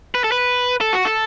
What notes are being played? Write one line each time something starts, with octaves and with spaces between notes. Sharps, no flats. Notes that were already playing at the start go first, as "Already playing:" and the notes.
B4
A4
B4
A4
F#4
A4